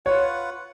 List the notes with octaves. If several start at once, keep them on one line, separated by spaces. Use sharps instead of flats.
F4 B4 C#5 F#5